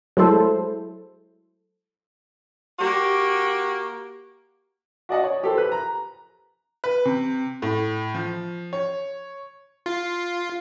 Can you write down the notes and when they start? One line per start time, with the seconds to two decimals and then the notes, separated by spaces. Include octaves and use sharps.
0.17 F#3 G#3 A3 E4 A4 C5
2.79 A#3 F#4 G4
5.09 F#4 D5 D#5 F#5
5.24 C#5
5.43 G4 A4 C5
5.58 B4 F#6
5.72 A#5
6.84 B4
7.05 C3
7.62 A2
8.14 F3
8.73 C#5
9.86 F4